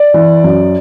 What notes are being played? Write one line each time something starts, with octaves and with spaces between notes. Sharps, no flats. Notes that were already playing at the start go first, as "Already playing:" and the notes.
Already playing: D5
E3
F#2